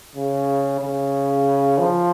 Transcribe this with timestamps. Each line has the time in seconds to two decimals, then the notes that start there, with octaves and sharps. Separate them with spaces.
0.16 C#3
0.80 C#3
1.78 F3